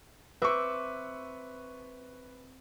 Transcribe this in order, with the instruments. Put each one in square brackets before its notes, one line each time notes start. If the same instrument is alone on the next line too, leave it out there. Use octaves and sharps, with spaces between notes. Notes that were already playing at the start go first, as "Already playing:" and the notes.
[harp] C4 E5 D6 [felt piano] B4 C#6